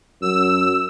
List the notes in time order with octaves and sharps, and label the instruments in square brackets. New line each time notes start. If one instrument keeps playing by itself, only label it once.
[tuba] F#2 [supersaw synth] E6